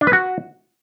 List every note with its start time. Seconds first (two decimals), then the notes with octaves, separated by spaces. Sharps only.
0.01 D4
0.07 B4
0.13 F#4